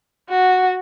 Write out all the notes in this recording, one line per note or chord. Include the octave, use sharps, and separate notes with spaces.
F#4